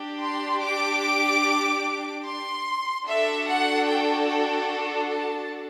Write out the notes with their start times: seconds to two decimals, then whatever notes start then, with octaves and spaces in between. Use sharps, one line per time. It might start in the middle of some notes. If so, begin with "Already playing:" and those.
Already playing: D4 G4
0.22 C6
0.63 D6
2.26 C6
3.07 D4 F#4 A4 E5
3.47 F#5
3.88 G5
4.29 G5
5.10 A5